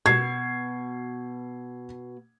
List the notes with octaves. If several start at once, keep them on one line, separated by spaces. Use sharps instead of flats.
B2 G#6 C7